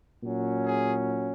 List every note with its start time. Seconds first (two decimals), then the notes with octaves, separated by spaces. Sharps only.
0.23 A#2 F#3 C#4
0.65 G#4